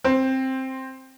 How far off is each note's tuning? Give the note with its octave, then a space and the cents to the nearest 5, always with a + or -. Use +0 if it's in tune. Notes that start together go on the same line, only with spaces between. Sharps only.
C4 +10 C5 +5